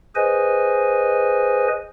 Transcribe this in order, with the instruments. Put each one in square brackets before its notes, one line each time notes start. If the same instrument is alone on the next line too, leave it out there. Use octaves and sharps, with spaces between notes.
[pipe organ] G#4 B4 C5 D#5 G#5